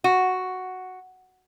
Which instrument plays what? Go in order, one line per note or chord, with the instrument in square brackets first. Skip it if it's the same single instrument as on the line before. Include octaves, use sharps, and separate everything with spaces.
[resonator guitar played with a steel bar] F#4